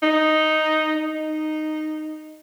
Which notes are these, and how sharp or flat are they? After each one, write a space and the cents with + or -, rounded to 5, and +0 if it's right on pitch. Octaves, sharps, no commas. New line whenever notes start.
D#4 +0
D#4 -10